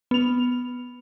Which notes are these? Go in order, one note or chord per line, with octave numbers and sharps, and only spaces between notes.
B3 F7